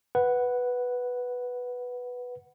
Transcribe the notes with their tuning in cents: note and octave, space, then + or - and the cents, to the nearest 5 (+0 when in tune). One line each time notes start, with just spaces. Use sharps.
B4 +0 F#5 +0